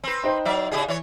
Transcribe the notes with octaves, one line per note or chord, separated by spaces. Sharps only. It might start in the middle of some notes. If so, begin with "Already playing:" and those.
C4 B4
D#4 C5 G5
F#3 D5 E5
C#3 G4 G#4
E3 C#5